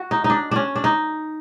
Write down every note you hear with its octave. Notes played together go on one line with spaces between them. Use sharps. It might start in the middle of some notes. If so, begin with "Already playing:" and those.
Already playing: F#4
D#4
D#4
D4
C#4 D4
D4
D#4